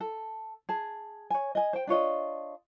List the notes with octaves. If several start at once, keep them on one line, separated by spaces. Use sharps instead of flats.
A4
G#4 A5
C#5 G#5
D#5 G#5
C5 G5
D4 F4 C#5 D#5